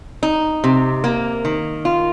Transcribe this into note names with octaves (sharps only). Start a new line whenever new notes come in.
D#4
C3
A#3
D#3
F4